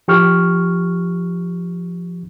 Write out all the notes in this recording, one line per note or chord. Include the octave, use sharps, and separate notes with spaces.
F3 G4 C#6 F6